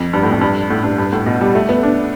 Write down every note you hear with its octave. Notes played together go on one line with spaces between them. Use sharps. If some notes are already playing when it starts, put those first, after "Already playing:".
Already playing: F2
G2
A2
F2
G2
A2
G2
G2
A2
B2
G3
A3
B3
D4